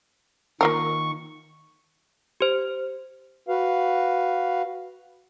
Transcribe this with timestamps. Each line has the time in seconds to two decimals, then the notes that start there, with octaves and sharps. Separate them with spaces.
0.61 D#3 A#3 F4 A#4 C#6
2.41 G4 C5
3.48 F#4 B4 F5